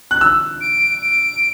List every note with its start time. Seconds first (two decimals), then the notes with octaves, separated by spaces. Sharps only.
0.11 F#6
0.21 E6
0.61 D7
1.01 D7